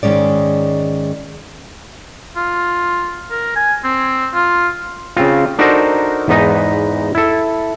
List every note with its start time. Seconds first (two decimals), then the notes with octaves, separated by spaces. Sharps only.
0.03 G#2 D#3 F#3 G#3 C#4 D5
2.36 F4
3.31 A#4
3.56 G#5
3.84 C4
4.34 F4
5.17 C#3 C4 F4
5.59 D4 D#4 F#4 A4 A#4 C5
6.28 E2 G#2 B3 D#4 B4 D#5
7.15 E4 A4